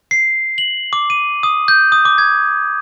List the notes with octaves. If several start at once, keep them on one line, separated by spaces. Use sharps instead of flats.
C7
F#7
D6
D#7
D#6
G6
D#6
D6
G#6